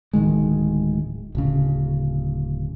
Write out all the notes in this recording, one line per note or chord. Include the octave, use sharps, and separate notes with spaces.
D1 D#3 G#3
D1 C#3